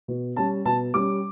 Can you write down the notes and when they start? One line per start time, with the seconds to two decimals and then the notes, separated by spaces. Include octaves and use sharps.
0.08 B2
0.36 G3 C#4 A5
0.65 B2 A5
0.94 G3 C#4 D6